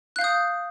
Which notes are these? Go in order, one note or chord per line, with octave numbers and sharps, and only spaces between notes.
F5 D#6 F#6 G6